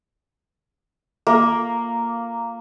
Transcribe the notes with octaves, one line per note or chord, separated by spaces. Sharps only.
A#3